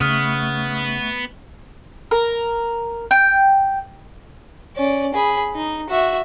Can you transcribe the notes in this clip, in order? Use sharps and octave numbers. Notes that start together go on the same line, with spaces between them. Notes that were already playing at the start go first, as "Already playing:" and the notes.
C#3 A3 B3 E5 C#6 D#6 F6
A#4
G5
C#4 D5
G#4 B5
D#4
F#4 E5